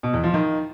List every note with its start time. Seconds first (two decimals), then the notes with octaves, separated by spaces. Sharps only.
0.03 B2
0.13 E2
0.24 F3
0.34 D#3